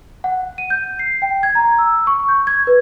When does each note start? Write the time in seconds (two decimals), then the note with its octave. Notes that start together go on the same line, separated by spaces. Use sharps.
0.24 F#5
0.58 D#7
0.70 G6
0.99 C7
1.22 G5
1.43 G#6
1.55 A#5
1.78 E6
2.07 C#6
2.29 G6
2.47 G#6
2.67 B4